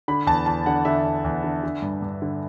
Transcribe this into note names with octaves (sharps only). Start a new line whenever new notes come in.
D3 B5
E2 A5
E2 A5
D3 F#5
D3 E5
E2
E2
D3
D3
G2
G2
D3